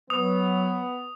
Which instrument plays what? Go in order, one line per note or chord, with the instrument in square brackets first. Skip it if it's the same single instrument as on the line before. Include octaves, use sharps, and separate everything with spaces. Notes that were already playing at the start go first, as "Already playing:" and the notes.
[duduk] F#3 [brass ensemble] B3 [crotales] D#6